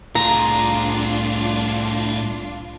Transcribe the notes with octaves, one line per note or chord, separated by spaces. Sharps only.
C2 A2 D4 F4 G#4 A#5